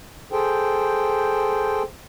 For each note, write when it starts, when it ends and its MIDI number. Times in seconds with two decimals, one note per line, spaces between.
0.32 1.83 68
0.32 1.83 69
0.32 1.83 72
0.32 1.83 79